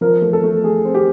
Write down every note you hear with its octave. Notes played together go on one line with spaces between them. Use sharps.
F3 A#4
A3
A4
A3
A3 G#4
C4
G4